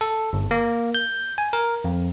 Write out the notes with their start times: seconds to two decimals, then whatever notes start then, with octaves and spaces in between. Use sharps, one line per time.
0.01 A4
0.33 G1
0.51 A#3
0.95 G6
1.38 G#5
1.53 A#4
1.84 F2